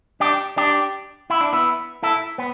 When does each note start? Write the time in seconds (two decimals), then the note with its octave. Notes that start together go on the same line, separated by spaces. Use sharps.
0.20 D4 G4
0.57 D4 G4
1.30 E4
1.41 D4
1.53 B3 E4
2.03 E4 A4
2.38 B3